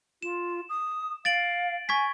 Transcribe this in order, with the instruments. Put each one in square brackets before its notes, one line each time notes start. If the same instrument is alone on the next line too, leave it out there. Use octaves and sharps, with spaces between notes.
[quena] F4 [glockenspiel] E7
[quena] D#6
[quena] F5 [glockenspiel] A6 D7 F#7
[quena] G#5 [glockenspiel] C#6 G#6 B6